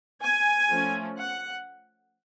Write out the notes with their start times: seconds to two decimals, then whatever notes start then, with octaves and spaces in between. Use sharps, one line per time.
0.21 G#5
0.70 F3 A3 C#4
1.18 F#5